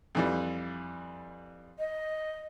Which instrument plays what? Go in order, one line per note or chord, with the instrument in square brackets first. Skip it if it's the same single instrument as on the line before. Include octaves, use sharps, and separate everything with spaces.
[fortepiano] F2 E3 G3
[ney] D#5